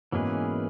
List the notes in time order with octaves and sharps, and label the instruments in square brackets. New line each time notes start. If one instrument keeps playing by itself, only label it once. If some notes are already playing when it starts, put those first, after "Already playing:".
[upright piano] G#2 B2 [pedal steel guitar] E3 A#3 C#4 G#4 B4